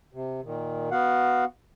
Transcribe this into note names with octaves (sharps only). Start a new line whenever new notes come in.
C3
A#2 D#3
B3 F#4 F5 F#5